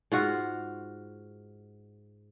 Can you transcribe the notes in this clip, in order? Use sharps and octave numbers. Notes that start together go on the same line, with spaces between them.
G#2 F4 F#4